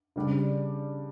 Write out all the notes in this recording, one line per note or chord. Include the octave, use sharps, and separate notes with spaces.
C#3 G3 D4